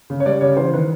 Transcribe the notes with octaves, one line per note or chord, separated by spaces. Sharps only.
C#3
C#5
G3 D5
C#3 C#5
E3 C5
D#3 B4